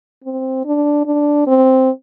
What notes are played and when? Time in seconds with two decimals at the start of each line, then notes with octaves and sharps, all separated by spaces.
0.24 C4
0.65 D4
1.06 D4
1.47 C4